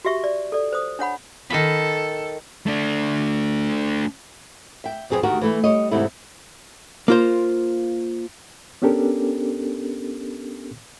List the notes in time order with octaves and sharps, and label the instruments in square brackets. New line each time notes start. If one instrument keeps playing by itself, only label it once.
[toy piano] F#4 G4 E5 C#6
D5
A4 D5
C5 D#6
D4 C#5 F#5 B5
[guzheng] D#3 B5 [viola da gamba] A4
[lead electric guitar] A3 D4
[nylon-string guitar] E5 G5
F2 B2 G#4 A#4 C5 G5
D2 D#3 F#4 G4 A#4
E3 A3 E4
G3 C#5 D#5
E2 G#2 C3 A3 E4
[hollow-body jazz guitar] A#3 F4 C5
[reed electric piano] B3 C#4 D4 G4 A4 A#4